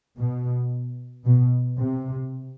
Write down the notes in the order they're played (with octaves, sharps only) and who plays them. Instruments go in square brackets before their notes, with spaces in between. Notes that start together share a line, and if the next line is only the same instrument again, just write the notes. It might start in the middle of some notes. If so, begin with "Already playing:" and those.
[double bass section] B2
B2
C3